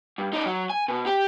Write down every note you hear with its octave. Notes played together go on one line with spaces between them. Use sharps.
G2
D#4 D5
F#3
G#5
B2
G4